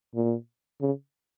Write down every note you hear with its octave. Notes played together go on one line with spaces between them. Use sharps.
A#2
C#3